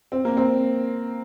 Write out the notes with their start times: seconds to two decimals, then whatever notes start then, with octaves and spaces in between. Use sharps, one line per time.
0.12 C4
0.25 A#3
0.37 C4